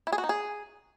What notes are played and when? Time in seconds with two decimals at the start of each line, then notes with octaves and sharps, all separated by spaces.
0.07 E4
0.12 G#4
0.18 F#4
0.24 D#4
0.29 G#4